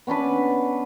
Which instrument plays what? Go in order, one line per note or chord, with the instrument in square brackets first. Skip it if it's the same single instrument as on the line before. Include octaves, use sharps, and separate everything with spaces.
[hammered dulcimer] B3 C#4 D4 B4